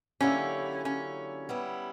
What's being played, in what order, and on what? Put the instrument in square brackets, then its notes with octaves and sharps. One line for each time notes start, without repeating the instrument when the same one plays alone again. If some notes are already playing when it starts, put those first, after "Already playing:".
[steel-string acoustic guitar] D3 F#3 A#3 E4 G4 [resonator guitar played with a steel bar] C#4
[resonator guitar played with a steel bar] C#4
[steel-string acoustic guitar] G3 B3 E4